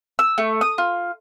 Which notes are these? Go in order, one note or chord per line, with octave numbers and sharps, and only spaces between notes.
E6
A3
D#6
F4